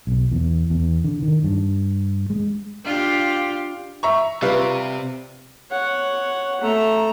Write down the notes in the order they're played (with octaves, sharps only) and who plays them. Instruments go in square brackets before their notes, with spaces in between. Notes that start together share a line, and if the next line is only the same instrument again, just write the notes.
[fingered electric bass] B1
E2
E2
D3
D#3
G2
G#3
[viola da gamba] D4 F4 G4
[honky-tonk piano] E5 A#5 C#6
[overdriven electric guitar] C3 [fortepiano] G3 F4 B4
[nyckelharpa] C#5 F#5
A3 A#5